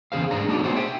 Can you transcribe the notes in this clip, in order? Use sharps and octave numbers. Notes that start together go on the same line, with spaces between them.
E2 C#3 G#4 C5 F5
G#2 G#3 D4 G#4 D5 A#5
A3 D4 D#4 F#4 C#5 D5
B3 D4 F#4 G#4 C5 F#5
E5 G5